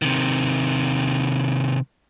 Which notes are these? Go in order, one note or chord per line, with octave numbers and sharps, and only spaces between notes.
C3 D#3